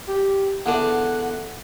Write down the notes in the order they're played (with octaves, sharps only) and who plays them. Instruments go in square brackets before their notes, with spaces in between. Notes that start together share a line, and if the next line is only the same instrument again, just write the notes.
[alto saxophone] G4
[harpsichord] E2 D3 D5 [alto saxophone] F#5